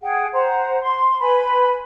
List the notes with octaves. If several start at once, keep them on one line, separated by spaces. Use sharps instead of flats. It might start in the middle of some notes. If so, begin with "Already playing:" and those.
G#4 F#5 G5
C5 F#5 A#5
C6
B4 G#5 B5